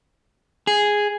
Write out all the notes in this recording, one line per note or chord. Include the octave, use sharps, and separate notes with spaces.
G#4